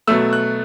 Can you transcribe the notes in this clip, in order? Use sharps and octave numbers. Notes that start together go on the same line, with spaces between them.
B2 F#3 A3 E6
F#6